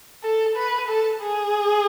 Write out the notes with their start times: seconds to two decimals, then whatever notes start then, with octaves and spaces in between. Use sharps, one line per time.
0.23 A4
0.56 B4
0.88 A4
1.22 G#4